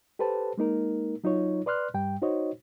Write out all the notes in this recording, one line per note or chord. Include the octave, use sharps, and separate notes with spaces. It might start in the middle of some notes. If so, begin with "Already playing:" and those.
G4 A4 B4 C5 A5
G#3 A#3 D#4 A#4
F#3 D#4 F4 C#5
B4 D5 C6 F6 F#6
G2 G3 G5
D#4 F#4 C5 C#5 D#5